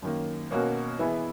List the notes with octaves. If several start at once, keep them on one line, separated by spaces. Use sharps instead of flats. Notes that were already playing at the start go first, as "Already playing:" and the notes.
F#2 D#3 A#3
B2 A#3 C#4 F#4 A#4
E3 B3 E4 G#4